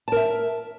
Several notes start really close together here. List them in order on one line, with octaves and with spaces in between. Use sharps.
A5 A#4 E5